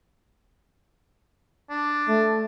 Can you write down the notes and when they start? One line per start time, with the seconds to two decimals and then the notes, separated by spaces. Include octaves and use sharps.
1.70 D4
2.08 A3